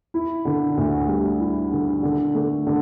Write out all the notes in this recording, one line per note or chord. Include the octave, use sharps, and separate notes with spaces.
E4
D3
D2
G3
E4
D3
D3
A3
D3